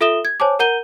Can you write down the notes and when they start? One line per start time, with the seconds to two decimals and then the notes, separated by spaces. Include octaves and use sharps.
0.01 F4 A4 E5 D#6 E7 G7
0.25 G#6
0.40 C5 C#5 G#5 A5 D6
0.59 A#4 F#5 A#5 G6 D#7 G7